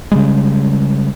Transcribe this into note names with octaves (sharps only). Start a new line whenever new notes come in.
C#3 G3 G#3